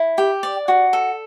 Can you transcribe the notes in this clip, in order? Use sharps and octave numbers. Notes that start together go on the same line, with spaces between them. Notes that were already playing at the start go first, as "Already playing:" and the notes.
Already playing: E4
G4
D5
F#4
A4